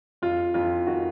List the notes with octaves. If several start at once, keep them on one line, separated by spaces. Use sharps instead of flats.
F2 F4
F2 F4
D#3 F#4